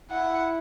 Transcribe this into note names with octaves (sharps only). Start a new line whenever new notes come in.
E4 F#5